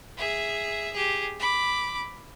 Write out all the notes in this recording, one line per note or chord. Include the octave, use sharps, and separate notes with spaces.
G#4 E5
G4 G#4
B5 D6